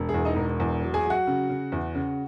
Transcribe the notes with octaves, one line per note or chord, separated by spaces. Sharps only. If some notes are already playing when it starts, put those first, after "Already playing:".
Already playing: E1
G#4
E2
D#4 D#5
E1
E2
F#3
G#4 G#5
F#3
F#4 F#5
C#3
C#3
E2
C#3